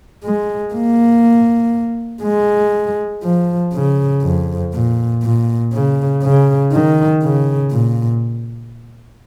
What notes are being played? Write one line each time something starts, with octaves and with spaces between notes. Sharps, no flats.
G#3
A#3
G#3
F3
C#3
F2
A#2
A#2
C#3
C#3
D#3
C#3
A#2